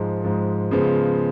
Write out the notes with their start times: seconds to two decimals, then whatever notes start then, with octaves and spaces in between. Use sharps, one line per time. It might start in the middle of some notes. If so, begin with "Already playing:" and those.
Already playing: G#2 F3 G#3
0.23 G#2 F3 G#3
0.71 C#3 F3 G#3 B3